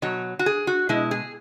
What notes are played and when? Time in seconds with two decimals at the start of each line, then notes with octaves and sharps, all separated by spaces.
0.02 B2 F#3 C#5
0.39 F#4
0.46 G#4
0.67 F#4
0.89 B2 G#3 E4
1.11 G#4